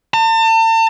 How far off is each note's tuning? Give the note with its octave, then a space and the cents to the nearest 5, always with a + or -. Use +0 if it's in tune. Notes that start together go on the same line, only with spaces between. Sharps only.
A5 +40